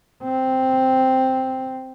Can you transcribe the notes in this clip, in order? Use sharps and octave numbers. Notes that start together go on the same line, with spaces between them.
C4